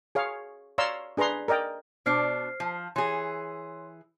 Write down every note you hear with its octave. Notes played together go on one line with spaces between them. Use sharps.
G#4 C#5 F5
C#5 D5 F5 A#5 C6 E6
D4 G#4 B4 A#5 C6
A#4 D5 D#5 G5
B2 D4 C5 F6 C7
F3
E3 G#4 C#5 C6